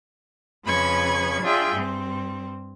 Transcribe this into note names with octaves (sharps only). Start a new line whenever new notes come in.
F2 C#3 B4 B5 C#6 G#6
D4 F4 G#4 E5 G5
G2 C4